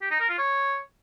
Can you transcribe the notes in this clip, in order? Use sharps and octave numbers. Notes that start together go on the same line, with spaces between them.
G4
D#4
A#4
F4
C#5